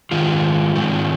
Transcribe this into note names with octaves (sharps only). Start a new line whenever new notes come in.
G#2 D#3 F4
G#2 D#3